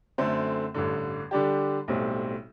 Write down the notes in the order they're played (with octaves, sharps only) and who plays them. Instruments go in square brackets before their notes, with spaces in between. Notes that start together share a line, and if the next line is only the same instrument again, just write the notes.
[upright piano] F#2 D3 A3 C4
A1 G2 D3
D3 G3 D4 G4
B1 A2 G3 C4